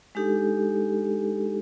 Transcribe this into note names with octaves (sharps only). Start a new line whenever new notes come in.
G#3 D4 D#4 G4 A4